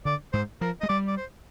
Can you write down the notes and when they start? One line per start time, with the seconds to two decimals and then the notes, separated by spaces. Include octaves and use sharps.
0.05 D3 D5
0.33 G#2 C5
0.61 F3 A#4
0.81 G#3 D#5
0.89 G3 D5
1.08 D5
1.17 C5